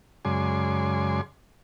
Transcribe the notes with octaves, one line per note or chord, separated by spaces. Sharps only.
F#2 C#3 G#3 D5 G#5 C6